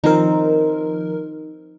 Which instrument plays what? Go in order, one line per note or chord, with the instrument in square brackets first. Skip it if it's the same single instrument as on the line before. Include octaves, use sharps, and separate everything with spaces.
[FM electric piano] D#3 F3 A#4 [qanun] C4 D#4